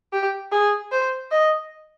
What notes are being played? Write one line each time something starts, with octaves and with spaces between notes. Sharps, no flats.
G4
G#4
C5
D#5